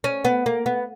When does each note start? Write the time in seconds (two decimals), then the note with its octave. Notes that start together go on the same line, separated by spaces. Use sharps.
0.04 C#4
0.25 B3
0.46 A#3
0.66 B3